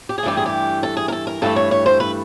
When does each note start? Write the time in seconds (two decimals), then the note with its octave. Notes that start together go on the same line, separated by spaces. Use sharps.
0.09 G4
0.18 G#4
0.23 G2 E3 A3 G4
0.37 G#4
0.46 G4
0.83 A4
0.97 G#4
1.08 A#4
1.12 A4
1.27 A#4
1.42 G2 E3 A3 A4
1.56 C#5
1.71 C#5
1.86 C5
2.00 B4